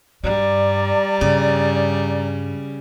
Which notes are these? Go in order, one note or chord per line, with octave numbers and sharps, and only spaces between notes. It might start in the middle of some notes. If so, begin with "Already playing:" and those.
G2 G3 D5 A#5
G2 C#3